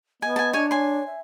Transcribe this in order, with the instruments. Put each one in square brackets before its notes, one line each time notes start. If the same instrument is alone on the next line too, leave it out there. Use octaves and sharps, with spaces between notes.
[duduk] B3 [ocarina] D#5 [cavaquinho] G#5
[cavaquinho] G#5 A5
[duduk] D4 [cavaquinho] C#5 G#5
[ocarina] C#5 [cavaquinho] G#5 C6
[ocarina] E5